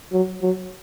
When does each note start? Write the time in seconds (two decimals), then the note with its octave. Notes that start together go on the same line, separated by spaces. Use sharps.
0.13 F#3
0.42 F#3